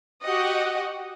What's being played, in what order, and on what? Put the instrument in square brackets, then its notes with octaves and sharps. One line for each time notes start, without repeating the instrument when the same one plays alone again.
[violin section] F#4 G4 D#5 F#5